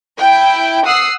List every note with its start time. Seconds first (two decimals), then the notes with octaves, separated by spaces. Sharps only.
0.19 E4 G5
0.85 F#5 D#6 E6 C7